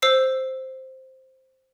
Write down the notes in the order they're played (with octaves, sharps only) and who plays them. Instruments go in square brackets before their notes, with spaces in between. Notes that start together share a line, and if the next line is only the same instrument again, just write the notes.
[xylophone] C5 E6 C7